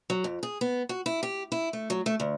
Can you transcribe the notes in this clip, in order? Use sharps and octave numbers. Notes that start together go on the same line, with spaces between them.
F#3
F2
G#4
B3
F#4
E4
G4
E4
A3
F#3
A3
D2